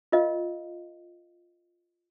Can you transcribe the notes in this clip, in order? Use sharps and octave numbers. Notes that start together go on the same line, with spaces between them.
F4 A#4 D#5 F5